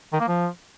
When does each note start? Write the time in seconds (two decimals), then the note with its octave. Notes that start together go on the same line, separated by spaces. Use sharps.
0.13 D#3
0.20 A#3
0.28 F3